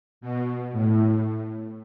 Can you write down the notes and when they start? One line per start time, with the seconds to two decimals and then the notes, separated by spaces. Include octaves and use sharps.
0.21 B2
0.72 A2